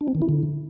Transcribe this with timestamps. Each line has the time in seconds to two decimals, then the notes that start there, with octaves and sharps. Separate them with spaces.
0.01 D4
0.08 C4
0.15 D#3
0.22 E4
0.29 D3